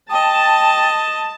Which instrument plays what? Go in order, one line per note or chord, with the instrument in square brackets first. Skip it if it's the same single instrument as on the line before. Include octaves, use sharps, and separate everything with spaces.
[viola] D#5 [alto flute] G5 [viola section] A5